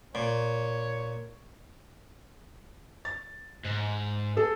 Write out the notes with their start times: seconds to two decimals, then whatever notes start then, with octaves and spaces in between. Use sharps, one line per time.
0.15 A#2 C#5
3.05 A6
3.64 G#2
4.36 G#4 A4